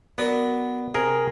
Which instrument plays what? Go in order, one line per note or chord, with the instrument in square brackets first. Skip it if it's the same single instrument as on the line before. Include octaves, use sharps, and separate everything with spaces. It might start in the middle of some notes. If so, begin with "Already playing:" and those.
[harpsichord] F#3 D4 A#4 [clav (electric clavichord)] B3
[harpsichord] C3 [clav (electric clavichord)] G#4 A#4